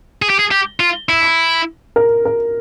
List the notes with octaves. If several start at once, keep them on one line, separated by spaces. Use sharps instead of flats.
G#4
G4
G#4
G4
F4
E4
A#4
A#4